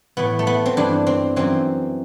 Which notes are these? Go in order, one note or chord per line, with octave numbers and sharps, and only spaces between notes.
A2 E3 B3
A3
B3
C4
G2 E3 D4
C4
F#2 E3 C4